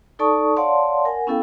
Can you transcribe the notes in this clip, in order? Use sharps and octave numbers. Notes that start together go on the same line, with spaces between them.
D#4 A4 D5 A5 C#6 D#6
C#5 D5 F5 F#5 A5 C6
A#4 F#5 G#5
B3 C#4 E4 A4 F5 G5